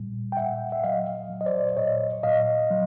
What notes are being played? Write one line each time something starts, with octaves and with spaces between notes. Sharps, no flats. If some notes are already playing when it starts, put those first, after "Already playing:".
Already playing: A#2 G3
G5
A#2 E5 F#5
E5
F#3 D#5 F5
F#3
D#5
C5 D5
A#2 C#5 D#5
A#2 D#5 F5
F#3